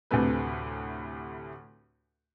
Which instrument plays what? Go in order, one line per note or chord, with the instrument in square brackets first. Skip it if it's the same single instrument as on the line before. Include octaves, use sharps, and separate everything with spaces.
[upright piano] D2 A2 C3 A3 B4